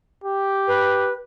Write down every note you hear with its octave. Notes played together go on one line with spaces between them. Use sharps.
G4
B4